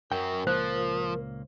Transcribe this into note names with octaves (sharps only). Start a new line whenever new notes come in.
F#2 F#3 A#4 G5
C#2 A#2 F3 A#3 C5